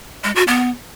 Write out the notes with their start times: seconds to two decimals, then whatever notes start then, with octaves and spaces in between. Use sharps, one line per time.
0.24 G#3
0.36 F#4
0.47 B3